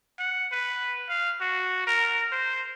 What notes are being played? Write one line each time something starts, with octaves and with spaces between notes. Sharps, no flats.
F#5
B4
F5
F#4
A#4
C5